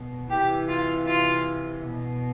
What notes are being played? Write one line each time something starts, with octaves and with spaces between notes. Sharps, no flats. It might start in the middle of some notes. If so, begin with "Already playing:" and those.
Already playing: B2
C3 E3 G4
F4
F4
B2